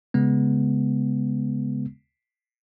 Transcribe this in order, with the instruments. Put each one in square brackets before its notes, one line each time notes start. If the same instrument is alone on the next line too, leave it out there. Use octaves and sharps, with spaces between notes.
[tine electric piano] C#3 G#3 B3